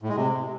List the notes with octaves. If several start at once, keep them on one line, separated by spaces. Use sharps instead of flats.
A2
G#3
C3